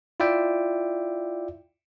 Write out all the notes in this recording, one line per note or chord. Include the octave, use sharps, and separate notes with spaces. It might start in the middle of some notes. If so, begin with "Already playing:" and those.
E4 F4 D5 E5 G5